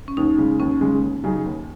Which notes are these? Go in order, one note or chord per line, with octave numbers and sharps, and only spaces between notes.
C#4
D#2 D#4
C#3 G#3
D#2 C#4
C#3 G#3
D#2
C#3 F#3 D#4 G#4
D#2